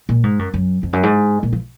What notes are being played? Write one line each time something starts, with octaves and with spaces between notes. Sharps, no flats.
A#2
G#2
F#2
F#2
F2
F#2
G#2
A#2
F3